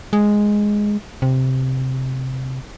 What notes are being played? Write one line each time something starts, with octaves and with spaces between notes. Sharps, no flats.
G#3
C3